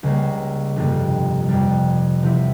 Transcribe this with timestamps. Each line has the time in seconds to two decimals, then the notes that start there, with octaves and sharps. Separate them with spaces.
0.03 C#2 C#3 G3 A#3
0.76 G1 F2 C3 G3 A#3
1.49 F2 C3 G3
2.22 E2 C3 F3 C4 E4